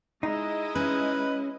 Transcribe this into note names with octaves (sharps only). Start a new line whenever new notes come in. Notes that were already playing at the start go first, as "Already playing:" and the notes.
G#3 D#4 E4 D#5
C#4 B4